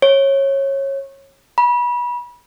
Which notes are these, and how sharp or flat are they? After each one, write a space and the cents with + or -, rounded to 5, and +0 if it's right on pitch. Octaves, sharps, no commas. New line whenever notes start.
C#5 -20
B5 -30